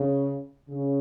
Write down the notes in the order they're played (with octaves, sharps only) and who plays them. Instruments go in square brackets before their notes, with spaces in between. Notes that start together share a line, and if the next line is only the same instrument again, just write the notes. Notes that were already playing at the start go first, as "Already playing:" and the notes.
Already playing: [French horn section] C#3
C#3